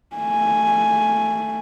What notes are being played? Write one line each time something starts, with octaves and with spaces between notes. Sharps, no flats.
A3 G#5